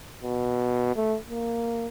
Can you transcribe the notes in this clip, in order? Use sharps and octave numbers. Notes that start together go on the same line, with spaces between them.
B2
A3
A#3